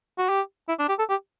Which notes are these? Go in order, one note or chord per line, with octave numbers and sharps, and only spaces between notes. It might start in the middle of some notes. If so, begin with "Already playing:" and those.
F#4
G4
E4
D4
G4
A4
G4